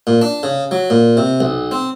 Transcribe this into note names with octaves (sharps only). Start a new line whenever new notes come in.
A#2
D4
C#3
F#3
A#2
C3
B1
C4